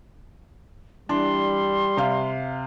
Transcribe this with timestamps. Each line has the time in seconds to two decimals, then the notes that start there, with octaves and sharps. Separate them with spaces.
1.09 E3 G3 D4 C6
1.97 C3 F5